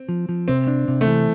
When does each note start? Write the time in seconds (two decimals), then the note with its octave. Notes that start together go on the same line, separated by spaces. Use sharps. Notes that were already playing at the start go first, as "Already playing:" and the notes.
Already playing: C4
0.09 F3
0.29 F3
0.48 C3 C4
0.67 D4
0.88 C3
1.01 A3
1.06 E3